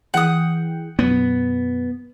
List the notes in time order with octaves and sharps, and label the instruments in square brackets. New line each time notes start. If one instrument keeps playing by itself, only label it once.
[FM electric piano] E3 G#4 G5 [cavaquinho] F#5 D#6
[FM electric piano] F#2 B2 [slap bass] B3